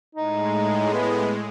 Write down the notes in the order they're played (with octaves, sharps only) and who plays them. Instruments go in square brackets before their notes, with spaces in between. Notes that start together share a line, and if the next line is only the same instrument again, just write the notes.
[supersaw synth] A2 G#3 [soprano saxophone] D#4
[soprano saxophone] B3